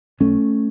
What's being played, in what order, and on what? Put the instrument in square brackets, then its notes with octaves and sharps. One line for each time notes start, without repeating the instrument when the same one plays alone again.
[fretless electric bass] B1 A3 C#4